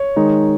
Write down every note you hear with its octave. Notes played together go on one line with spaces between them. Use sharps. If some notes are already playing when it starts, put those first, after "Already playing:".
Already playing: C#5
D#3 G#3 D#4